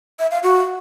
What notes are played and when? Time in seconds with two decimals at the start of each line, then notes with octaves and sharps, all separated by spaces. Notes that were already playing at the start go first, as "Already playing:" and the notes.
0.19 E5
0.31 F5
0.43 F#4